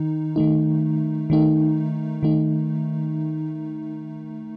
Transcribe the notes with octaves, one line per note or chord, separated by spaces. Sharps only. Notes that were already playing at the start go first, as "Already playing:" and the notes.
Already playing: D#3 D#4
D#3 A3 D#4
D#3 A3 D#4
D#3 A3 D#4